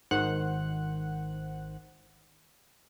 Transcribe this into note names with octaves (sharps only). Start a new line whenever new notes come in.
G#1 D#3 C5 F#5 F#6